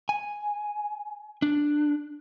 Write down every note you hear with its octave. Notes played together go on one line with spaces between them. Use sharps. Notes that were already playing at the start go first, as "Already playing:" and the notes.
G#5
D4